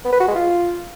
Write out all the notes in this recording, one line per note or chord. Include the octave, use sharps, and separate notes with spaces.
B3
B4
F#4
G#3
F4